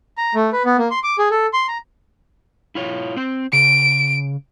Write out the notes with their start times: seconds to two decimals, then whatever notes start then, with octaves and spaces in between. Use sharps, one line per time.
0.18 A#5
0.35 A3
0.52 B4
0.65 B3
0.78 A#3
0.91 C6
1.04 D6
1.19 G#4
1.31 A4
1.53 C6
1.68 A#5
2.75 E4 F4 C#5
3.16 C4 C5
3.53 C#3 D7